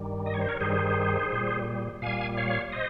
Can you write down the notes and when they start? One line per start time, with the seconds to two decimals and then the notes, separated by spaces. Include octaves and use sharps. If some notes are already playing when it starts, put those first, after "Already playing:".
Already playing: G2 D#3 G3
0.26 D#5
0.34 C#5
0.41 C5
0.49 A#4 C#5
0.60 G2 D#3 G3 G#4 C5
1.32 A#2 G3
2.02 A#2 G3 F5 G#5
2.37 C#5 F5
2.72 C5 D#5